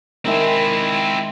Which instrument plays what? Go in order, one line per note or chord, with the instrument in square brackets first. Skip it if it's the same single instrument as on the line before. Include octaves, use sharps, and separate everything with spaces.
[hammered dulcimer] D#3 G#3 E5 [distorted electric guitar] C4 E4